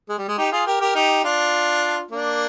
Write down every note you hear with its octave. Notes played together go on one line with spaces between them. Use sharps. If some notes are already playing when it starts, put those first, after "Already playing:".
G#3
G3
G#3
D#4 G4
F4 G#4
G4 A#4
G4 A#4
D#4 G4
D4 F4
A#3 D4